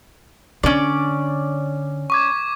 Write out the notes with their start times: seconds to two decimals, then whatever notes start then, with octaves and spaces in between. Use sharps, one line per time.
0.64 D3 C#4 D5
2.10 C#6 D6 G#6